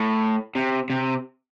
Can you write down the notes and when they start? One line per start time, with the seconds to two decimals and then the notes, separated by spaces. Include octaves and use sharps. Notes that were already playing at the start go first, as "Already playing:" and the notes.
Already playing: A2
0.55 C3
0.90 C3